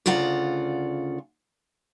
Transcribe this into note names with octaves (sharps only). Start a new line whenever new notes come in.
D2 C#3 F4 D5 F#5 A#5